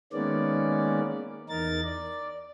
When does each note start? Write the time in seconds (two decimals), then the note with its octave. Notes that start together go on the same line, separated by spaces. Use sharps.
0.13 D#3 G#3 A#3 B3 C#4 D5
1.49 E2 D#4 A#4 A6
1.85 D5